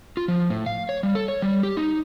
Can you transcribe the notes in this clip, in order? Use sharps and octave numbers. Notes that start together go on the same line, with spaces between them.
F4
F3
A2
F5
C#5
G3
A4
C#5
G3
G4
D#4